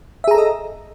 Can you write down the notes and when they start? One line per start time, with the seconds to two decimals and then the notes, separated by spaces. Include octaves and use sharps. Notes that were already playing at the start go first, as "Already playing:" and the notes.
0.24 E5
0.28 G#4
0.31 A#5
0.35 A4
0.38 D#5